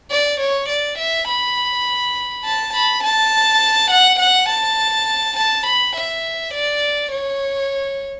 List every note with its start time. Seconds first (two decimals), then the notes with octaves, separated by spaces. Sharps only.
0.11 D5
0.40 C#5
0.69 D5
0.98 E5
1.28 B5
2.45 A5
2.74 B5
3.03 A5
3.91 F#5
4.19 F#5
4.49 A5
5.37 A5
5.66 B5
5.96 E5
6.54 D5
7.12 C#5